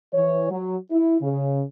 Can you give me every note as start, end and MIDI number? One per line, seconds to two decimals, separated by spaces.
0.13 0.50 52
0.13 0.50 73
0.50 0.75 54
0.91 1.16 64
1.21 1.61 49